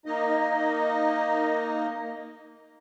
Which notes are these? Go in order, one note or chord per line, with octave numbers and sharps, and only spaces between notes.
A#3 D#4 D#5